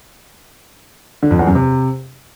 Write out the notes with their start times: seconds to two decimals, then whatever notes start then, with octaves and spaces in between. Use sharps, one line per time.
1.23 D3
1.31 F2
1.39 E2
1.47 F#2
1.55 C3